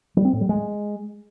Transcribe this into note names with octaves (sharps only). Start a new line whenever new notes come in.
G3
C4
A2
G3
G#3